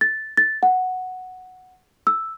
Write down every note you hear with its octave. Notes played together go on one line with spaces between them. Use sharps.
A6
A6
F#5
E6